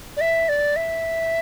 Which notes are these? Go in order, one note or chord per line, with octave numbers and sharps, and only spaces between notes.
D5
E5
D5
E5